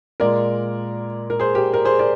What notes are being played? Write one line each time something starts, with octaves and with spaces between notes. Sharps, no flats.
A#2 G#3 A#4 D5
A#4
G#4 C5
G4 A#4
A#4
G#4 C5
A#4 D5